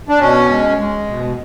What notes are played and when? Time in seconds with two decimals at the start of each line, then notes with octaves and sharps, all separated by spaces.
0.09 D4
0.20 B2 C#4
0.50 G#3
0.78 G#3
1.08 B2